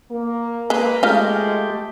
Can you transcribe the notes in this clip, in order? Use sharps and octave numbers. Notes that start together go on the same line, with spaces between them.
A#3
G#3 A#3 B4
G#3 A3 F4 G4 D#5 F5